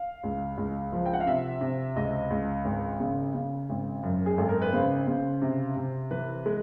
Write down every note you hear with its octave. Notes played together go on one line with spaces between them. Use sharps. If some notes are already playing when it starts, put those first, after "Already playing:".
Already playing: F5
C#2
C#2
F3
G5
F#5
F5
C3 E5
C3
C#2 D#5
C#2
G#1
C#3
C#3
G#1
F#2
G#4
G#1 A4
A#4
B4
C#3 C5
C#3
C3
C3
E3 B4
G#3